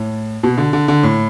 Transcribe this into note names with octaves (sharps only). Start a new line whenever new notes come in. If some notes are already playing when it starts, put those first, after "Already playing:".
Already playing: A2
B2
D3
D3
D3
A2